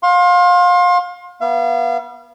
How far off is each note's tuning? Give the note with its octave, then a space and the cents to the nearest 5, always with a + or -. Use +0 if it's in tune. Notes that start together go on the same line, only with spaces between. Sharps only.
F5 +30 C6 +30
B3 -30 F5 -40